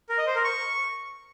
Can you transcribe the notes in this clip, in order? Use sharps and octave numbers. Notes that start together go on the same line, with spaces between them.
A#4
D#5
C5
A#4
C#6